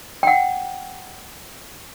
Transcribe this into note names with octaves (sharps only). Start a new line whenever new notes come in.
F#5 G5